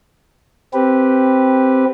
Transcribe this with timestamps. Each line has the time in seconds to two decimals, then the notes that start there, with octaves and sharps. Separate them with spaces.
0.74 C4 G4 B4